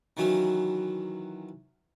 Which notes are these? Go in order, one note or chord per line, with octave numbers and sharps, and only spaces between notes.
D#3 E3 F#3 C#4